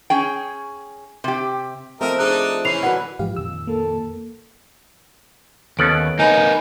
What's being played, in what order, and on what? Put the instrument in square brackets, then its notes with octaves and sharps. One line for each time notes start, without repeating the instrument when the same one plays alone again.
[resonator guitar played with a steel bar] C#4 G#4 G5
C3 G4
[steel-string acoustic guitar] F3 A3 C4 [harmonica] A#4 D#5 E5
[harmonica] D4 D#4 [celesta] G#4 F#6
[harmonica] E3 C#4 [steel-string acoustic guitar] E4 C5 [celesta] C7 F7
[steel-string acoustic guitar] D3 F#3 B4 [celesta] F#5
[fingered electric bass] G#2 E3 F3 [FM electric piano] G4 F5
[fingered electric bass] F2 A#2 D#3 [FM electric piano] E6
[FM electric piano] A#3 [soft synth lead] A4
[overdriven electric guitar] D#2 [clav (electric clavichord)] B3 C#4 A4 [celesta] D7 F#7
[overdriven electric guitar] A#3 B4 [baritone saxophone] D#4 [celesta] G#5